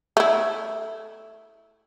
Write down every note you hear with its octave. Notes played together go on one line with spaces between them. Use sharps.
A3 E4